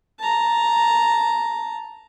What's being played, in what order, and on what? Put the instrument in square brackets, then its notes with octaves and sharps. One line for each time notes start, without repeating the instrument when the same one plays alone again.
[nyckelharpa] A5 A#5